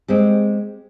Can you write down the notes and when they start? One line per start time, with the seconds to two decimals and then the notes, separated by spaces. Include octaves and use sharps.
0.08 G#3 C4 G4